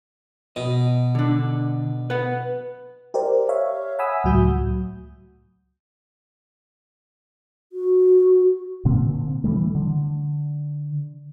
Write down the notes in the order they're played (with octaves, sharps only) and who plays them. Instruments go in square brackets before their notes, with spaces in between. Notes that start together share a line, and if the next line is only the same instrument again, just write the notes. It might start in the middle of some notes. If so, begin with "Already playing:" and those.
[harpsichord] B2 [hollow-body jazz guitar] D#5
[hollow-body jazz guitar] D3 D4
B4 F#5
[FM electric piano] G4 A#4 C5 D5
C#5 E5 F5
E5 F#5 G#5 B5 D#6 E6
C#2 A2 F#3 F#4 D#6 G6
[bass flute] F#4
[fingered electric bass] A#2 D3 A#3 C4
E3 F3 G3 A3
D3